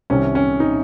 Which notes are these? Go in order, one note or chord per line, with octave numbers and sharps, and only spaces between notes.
C2 C3 D#3 C#4
C#4
D#4